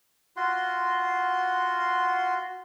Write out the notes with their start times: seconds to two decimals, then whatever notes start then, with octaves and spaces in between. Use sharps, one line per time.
0.36 F4 F#4 F#5 C6